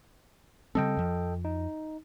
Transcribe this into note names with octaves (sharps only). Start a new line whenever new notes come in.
C#3 G3 C4 A4 D#5 G5
F2 F3
D#4